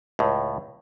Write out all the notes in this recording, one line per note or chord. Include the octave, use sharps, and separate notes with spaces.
C#2 A2